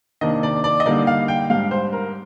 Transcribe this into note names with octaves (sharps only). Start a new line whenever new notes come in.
C3 D#3 A#3 D4 D#5
D5
D5
D#5
D3 G3 A#3 D#4 D5
F5
G5
G#2 G3 D4 F5
C5
A#4